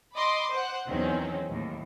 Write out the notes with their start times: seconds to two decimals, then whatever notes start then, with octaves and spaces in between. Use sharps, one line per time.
0.16 D#5 B5 C6 D6
0.52 C5 F#5
0.87 E2 D#3 F#3 C4 C#4
1.49 D#2 A2